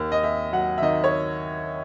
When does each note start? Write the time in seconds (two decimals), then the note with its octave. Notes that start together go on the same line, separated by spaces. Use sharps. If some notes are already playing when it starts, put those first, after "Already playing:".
Already playing: D#2
0.12 D#5
0.23 D#2 E5
0.52 F#3 F#5
0.78 E5
0.82 D#3 D#5
1.04 C#5